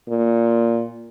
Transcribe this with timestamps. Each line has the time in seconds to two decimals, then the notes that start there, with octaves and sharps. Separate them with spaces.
0.09 A#2